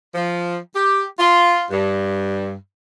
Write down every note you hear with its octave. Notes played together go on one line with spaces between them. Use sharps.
F3
G4
F4
G2